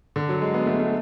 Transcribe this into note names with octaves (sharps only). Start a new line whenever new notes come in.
D3
F#3
G#3
B3
A3
A3